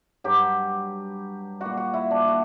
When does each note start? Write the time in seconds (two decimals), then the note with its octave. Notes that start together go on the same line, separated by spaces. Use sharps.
0.24 G2 F#3 G4
1.60 A#2 G3 F#4
1.77 F#4
1.94 E4
2.11 D4
2.28 F#4